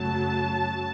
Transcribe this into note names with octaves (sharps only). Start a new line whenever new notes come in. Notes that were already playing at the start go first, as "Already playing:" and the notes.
Already playing: F#2 C#3 F#3 A3 A5